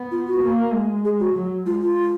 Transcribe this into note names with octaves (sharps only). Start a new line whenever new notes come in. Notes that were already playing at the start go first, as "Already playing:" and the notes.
Already playing: B3
F4
F#4
A#3
G#3
G#4
F#4
F#3
G#3 F4
F4